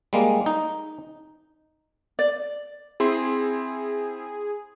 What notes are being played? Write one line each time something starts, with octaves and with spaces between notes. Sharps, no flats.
G3 G#3 A#3
D#4
D5
C4 E4 G#4 C6